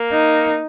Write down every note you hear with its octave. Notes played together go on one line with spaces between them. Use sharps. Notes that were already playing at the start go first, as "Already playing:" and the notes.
Already playing: A#3
D#4